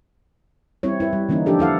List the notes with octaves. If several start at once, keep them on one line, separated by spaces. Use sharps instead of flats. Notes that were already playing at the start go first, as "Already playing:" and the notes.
G3 C4 E4 C#5
E4 B4
G3
D3 E3 A#3 C#4 D#4
F3 D4 G4 A4
E4 A4 F5 F#5